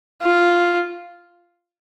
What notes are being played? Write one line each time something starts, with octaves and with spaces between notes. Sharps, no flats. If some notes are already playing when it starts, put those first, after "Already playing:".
F4